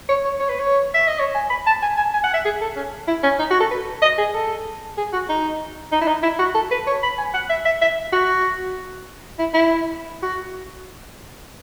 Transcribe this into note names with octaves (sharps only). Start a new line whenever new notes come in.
C#5
C#5
C#5
B4
C#5
E5
D#5
C#5
G#5
B5
A5
G#5
G#5
G#5
F#5
E5
G#4
A4
C#4
E4
C#4
D#4
F#4
A4
B4
D#5
G#4
A4
G#4
F#4
D#4
D#4
E4
D#4
E4
F#4
A4
B4
C#5
B5
G#5
F#5
E5
E5
E5
F#4
E4
E4
F#4